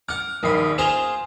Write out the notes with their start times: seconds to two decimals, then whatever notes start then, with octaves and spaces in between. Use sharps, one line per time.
0.09 F#5 D6 F6
0.43 A#1 D#2 B5 D#6 C7
0.78 F4 G#4 C5 E7 F7